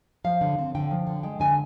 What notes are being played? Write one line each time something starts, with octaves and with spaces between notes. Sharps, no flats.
F3 F5
D3
C4
D3 G5
F3
D3
G#3 G5
D3 G#5